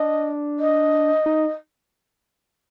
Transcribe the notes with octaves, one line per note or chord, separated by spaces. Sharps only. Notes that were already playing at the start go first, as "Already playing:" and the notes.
Already playing: D4 D#5
D#5
D#4